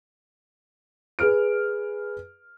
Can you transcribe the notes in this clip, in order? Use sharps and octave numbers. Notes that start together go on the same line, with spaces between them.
G#4 B4 F6 D7